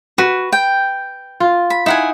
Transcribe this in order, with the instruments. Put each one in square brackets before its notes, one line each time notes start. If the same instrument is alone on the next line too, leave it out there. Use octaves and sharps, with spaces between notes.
[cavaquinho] F#4 [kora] B4
[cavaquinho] G5
[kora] F4
[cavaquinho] B5
[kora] D#4 [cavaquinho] E4 F#5 G#5